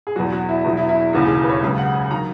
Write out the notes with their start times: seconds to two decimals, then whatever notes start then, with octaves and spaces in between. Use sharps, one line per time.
0.07 G#4
0.16 E2 B2 F#3 F#4
0.32 F#4
0.49 E4
0.64 E2 B2 F#3 E4
0.77 E4
0.89 E4
1.13 E1 D#2 C#3 E3 F#4
1.25 G#4
1.44 B4
1.49 C#5
1.62 C#2 C#3 F#3
1.78 F#5
1.95 G#5
2.11 D#3 F#3 A#5